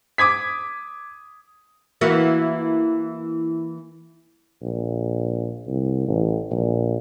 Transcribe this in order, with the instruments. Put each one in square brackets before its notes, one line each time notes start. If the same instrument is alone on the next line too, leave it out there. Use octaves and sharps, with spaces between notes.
[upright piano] D6 D#6 G#6 B6
[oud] E3 A#3 F#4
[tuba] A#1
C2
A1
A#1